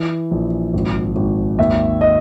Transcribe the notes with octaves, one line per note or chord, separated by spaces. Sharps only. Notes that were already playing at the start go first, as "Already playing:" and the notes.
Already playing: E3
A#1
G#1
G#1
D#2 E5
D#5